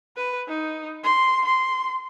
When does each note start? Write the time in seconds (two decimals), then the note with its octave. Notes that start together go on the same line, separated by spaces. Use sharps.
0.17 B4
0.48 D#4
1.04 C6
1.45 C6